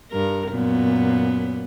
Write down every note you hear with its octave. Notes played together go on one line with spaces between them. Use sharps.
G2 A#4
F#2 A#2 B3